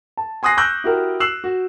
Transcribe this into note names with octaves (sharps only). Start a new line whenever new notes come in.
A5
G#5 C6 D#6 F#6 A#6 C7
C#6 D6 E6 F#6 G6 A#6
E4 F#4 G4 A#4
E6 F#6 C7 E7 F#7
F#4